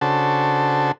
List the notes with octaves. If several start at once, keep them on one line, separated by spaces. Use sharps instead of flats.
C#3 D4 F#4 A4 C5 A5